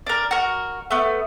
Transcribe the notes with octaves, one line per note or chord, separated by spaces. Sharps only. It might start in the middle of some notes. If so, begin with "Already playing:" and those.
D4 A#4
F#4 A#4
A3 B3